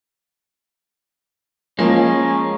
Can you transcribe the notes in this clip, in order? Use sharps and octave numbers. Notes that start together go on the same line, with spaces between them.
F3 G#3 A#3 C#4